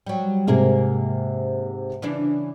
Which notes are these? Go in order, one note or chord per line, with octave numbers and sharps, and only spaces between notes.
F#3 G3
G#2 C3 A#3 G#4 A#4
C#3 E3 D4